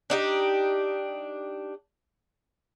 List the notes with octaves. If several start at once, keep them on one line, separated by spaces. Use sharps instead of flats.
D4 D#4 G4